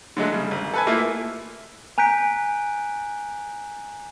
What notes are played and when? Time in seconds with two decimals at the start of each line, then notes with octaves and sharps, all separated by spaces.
0.17 D3 F#3 G#3 A3
0.32 C#3 G3
0.51 G#1
0.74 A4 B4 G#5
0.87 A3 A#3 E4 F4
1.98 G#5 A#5 F#6 G6 B6 D7